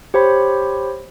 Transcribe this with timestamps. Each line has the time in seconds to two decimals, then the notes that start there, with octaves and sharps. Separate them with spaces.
0.14 G4 C5 C#5 B5